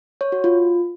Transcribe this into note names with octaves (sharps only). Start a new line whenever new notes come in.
C#5
F#4
F4